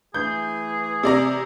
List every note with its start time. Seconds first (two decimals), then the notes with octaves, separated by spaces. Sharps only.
0.14 E3 A3 G#4 G6
1.03 C3 D5 A#5